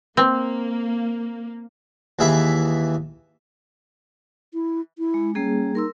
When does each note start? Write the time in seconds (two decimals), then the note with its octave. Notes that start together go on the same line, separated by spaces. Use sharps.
0.17 A#3 C4
2.19 D#2 E3 G#4 E5 B5
4.54 E4
4.98 E4
5.14 G#3
5.35 G3 A#3 C#4 G#4
5.75 D#4 A#4 C6 E6